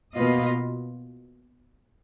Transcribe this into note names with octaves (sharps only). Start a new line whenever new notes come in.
B2 A#3 F4 B4 D#5